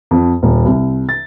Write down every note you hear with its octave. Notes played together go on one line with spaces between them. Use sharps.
F2
D#1
C2
A6